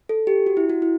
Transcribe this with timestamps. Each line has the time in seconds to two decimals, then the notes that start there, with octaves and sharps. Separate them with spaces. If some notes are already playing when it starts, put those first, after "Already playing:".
0.09 A4
0.27 G4
0.46 F#4
0.57 E4
0.70 F#4
0.82 E4